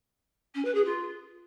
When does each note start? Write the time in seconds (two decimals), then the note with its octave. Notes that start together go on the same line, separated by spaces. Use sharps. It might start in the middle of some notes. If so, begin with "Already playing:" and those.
0.54 C#4
0.64 B4
0.74 G#4
0.84 F4